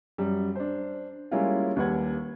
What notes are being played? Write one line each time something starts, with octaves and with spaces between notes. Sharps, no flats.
F#2 G3
D4 C5
G3 G#3 A#3 C#4 E4 F4
D#2 G3 B4 F#5 G#6